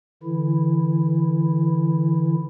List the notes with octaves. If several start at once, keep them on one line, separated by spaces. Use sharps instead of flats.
D3 E3 E4